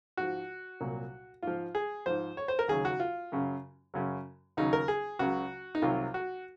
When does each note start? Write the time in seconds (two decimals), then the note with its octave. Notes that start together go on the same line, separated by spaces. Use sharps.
0.17 G#2 F3 F#4
0.80 C2 A#2 F#3
1.42 G#2 F3 F4
1.75 G#4
2.06 G#2 F3 C5
2.37 C#5
2.48 C5
2.59 A#4
2.68 D#2 C#3 F#3 G#4
2.85 F#4
3.00 F4
3.32 F#2 C#3 F#3
3.94 F#2 C#3 F#3
4.57 D#2 C#3 F#3 D#4
4.73 A#4
4.88 G#4
5.19 C#2 C#3 F#3 F#4
5.75 D#4
5.82 C2 C3 D#3 F#3 F4
6.14 F#4